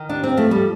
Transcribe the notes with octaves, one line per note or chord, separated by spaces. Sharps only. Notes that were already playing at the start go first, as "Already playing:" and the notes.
Already playing: D#3
D#2 D4
C4
F3 A3
G3